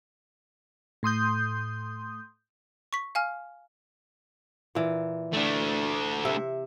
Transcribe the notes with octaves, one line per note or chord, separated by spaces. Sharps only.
A2 C6 D#6 G6
C#6 B6
F5 G#5 F6
A#2 E3
A3 D4
C3 E5